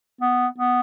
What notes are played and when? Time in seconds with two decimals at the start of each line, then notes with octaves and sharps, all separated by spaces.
0.21 B3
0.58 B3